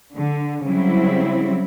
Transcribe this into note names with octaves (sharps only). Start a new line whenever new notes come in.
D3
C#3 F#3 G3 C4 E4